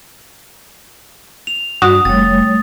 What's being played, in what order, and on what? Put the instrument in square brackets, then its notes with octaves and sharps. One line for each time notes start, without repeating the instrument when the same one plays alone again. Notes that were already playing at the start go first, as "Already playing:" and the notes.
[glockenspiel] F7
[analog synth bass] G2 [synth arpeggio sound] F#4 [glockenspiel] D#6
[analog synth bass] F1 [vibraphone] G3 A3 C#5 [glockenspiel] A6